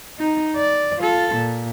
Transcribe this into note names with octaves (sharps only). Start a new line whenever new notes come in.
D#4
D5
F4 A4
A#2